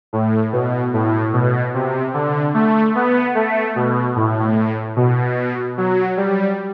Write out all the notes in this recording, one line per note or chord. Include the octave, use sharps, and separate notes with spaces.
A2
B2
A2
B2
C3
D3
A3
B3
A3
B2
A2
B2
F#3
G3